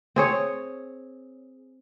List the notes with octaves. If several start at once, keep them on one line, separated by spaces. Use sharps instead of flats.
C4 G#4 C#5